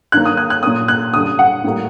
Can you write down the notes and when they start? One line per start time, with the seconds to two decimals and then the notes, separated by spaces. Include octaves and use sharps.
0.12 G2 D#3 F#3 A#3 F#6
0.26 D#6
0.37 F#6
0.50 F#6
0.63 A#2 F#3 A#3 D#6
0.88 F#6
1.13 F#2 D3 G3 D#6
1.39 F#5
1.64 A2 G3 A#3